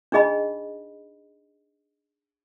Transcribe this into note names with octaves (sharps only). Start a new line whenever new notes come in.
D4 D#4 G#4 D#5 B5